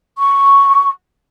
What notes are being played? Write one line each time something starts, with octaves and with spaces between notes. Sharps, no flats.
C#6